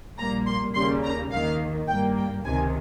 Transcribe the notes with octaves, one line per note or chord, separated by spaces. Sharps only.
A#1 A#2 G3 A#3 A#5
C6
D#2 C#3 G3 A#3 C6
A#5
D#2 D#3 A#3 F5
G2 G3 A#3 G5
G5
C#2 C3 D#3 G#5